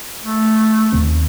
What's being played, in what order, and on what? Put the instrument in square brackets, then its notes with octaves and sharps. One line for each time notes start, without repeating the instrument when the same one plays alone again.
[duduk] A3
[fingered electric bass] D#2 D#3 C4